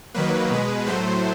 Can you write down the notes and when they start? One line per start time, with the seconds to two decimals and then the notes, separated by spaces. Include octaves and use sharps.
0.14 D#3 F#3 A#3 B4
0.50 B2 G#3
0.86 A2 F#3 A3 C5